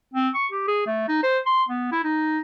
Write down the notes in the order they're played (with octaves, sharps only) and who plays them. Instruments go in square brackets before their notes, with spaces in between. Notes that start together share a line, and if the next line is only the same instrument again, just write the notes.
[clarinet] C4
C#6
G4
G#4
A3
D#4
C5
C6
B3
E4
D#4